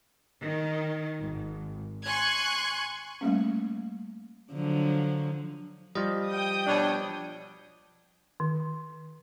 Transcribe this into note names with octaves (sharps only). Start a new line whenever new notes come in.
D#3
G#1
G#5 C6 C#6 F#6 G#6
G3 A3 A#3 C#4
D3 F3 F#3
F3 G3 D#5
G5 D#6
B2 D4 C#5
D#3